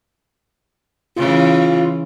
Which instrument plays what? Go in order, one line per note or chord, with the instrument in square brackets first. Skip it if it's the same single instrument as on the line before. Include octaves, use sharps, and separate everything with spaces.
[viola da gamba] C#3 E3 [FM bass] F4